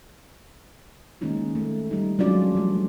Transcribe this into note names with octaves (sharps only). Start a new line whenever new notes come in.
D#3 G#3 A#3 C#4 D#4 F4
A3
G3 D#4
F#3 G#3 C#4 D4 F4 D5
F3 G3 A3